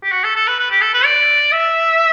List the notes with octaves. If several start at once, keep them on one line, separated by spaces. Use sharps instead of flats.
G4
F#4
A4
A4
B4
B4
G4
A4
B4
D5
E5